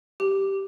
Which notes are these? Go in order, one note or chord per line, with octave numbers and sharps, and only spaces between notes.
G4